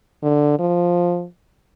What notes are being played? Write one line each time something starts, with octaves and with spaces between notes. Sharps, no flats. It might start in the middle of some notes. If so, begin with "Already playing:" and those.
D3
F3